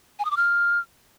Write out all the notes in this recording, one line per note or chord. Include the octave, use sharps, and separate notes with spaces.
G#5
D#6
D6
F6